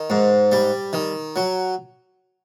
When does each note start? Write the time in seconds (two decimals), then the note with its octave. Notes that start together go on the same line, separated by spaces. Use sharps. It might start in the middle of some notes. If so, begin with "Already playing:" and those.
Already playing: D#3
0.10 G#2
0.52 G3
0.93 D#3
1.36 F#3